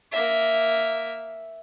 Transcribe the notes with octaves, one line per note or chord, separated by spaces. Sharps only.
A#3 E5